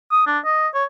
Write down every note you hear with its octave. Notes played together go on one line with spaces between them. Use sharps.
D#6
D4
D#5
C#5